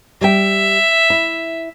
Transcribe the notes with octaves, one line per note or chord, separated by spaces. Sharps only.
G3 E5 G5
E4